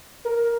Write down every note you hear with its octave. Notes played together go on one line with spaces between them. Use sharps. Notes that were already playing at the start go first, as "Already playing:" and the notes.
A#4